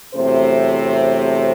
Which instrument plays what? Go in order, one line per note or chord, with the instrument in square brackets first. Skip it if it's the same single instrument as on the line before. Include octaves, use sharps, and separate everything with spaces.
[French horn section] E2 C3 F#3 A3 C5